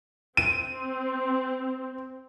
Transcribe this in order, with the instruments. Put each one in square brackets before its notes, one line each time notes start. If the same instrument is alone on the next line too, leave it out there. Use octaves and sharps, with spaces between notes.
[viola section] C4 [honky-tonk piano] D#7